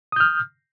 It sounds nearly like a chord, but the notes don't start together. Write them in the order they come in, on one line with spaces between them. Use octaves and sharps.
D#6 G6 F6